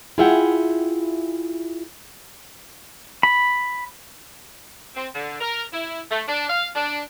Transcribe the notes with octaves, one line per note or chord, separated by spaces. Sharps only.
E4 F4 G#4 E5 F#5 G5
B5
C4
D3
A#4
E4
A3
D4
F5
D4